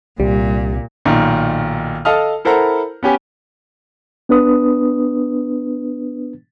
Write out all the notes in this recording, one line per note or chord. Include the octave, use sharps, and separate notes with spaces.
C2 A#2 G3
B1 A#2 D#3
A4 D#5 F5 A5 D#6 F6
E4 A4 A#4 C5 F#5 A#5
B3 C#4 G4 G#5
B3 D4 B4 D#6